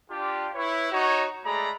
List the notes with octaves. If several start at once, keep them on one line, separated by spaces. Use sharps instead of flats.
D4 F4 G4
E4 B4 C#5
D#4 F#4 C#5
G#3 A3 G#4 D5 A#5 B5